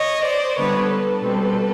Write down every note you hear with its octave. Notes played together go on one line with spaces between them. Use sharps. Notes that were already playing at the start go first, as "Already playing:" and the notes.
Already playing: C#5 D#5
C5 D5
D3 G3 B3 B4 C#5
A4 B4
B2 G3 C4